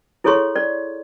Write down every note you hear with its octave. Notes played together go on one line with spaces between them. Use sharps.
E4 G#4 A4 C#5 C6 C#6
D5